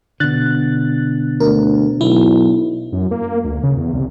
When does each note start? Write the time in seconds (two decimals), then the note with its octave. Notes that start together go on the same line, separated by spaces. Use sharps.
0.20 B2 D3 F#6 A6
1.40 D2 A#4
2.01 B1 E4
2.92 F#2
3.11 A#3
3.44 D2
3.63 C#3
3.77 E2
3.93 C2